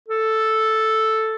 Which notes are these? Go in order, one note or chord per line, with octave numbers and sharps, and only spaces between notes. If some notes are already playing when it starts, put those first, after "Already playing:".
A4